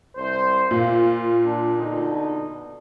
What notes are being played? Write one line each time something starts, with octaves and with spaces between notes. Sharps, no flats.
C2 C5
A#2 F4
D4
B2 D3 D#4